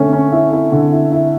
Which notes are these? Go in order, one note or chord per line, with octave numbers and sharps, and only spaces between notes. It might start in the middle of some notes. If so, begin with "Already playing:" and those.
Already playing: D3 A3 C#4
C#4
E4
E4
D3
E4
E4